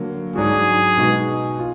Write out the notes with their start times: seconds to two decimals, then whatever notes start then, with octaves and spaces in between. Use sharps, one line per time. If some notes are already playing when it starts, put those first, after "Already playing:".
Already playing: D3 F#3 A#3
0.35 G#2 F#3 D4 F#4 G#4
0.97 B2 G#3 D#4 F#4
1.59 F4